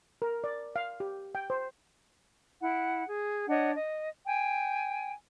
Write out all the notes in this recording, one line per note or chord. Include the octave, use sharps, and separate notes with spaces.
A#4
D5
F5
G4
G5
C5
E4 F#5
G#4
D4 C#5 D#5 F#5
D#5
G5 G#5